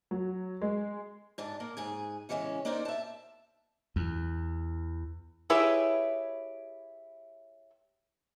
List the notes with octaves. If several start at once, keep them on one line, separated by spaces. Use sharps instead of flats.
F#3
G#3
G#2 D4 A5
A#3 A#4
G#2 G#4 G#5
C#3 E3 G3 G#3 C#4
A#3 D4 D#4 A#4 C5 D5
E5 A5
E2
E4 G4 G#4 B4 C#5 E5